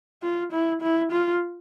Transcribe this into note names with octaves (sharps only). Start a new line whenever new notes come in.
F4
E4
E4
F4